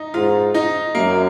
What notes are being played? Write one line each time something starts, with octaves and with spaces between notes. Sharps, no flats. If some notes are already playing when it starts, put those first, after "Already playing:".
Already playing: D#4
G#2 F4
D#4
F#2 A#3